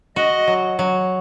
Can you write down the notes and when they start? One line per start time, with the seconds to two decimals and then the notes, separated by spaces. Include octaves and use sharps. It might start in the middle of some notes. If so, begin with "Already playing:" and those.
0.16 F#4 D#5
0.47 F#3
0.79 F#3